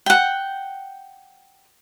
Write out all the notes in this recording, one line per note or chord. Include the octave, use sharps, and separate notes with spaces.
F#5 G5